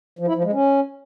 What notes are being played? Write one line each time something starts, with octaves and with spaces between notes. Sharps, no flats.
F3
E4
F3
G#3
C#4